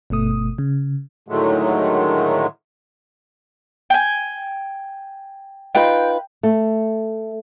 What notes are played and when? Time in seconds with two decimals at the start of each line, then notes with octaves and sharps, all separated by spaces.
0.10 G1 B2 A3 D#6
0.58 C#3
1.28 A2 D3 D#3 F#3 G#3 A3
3.90 G5 G#5
5.75 D#4 F4 B4 G5
6.43 A3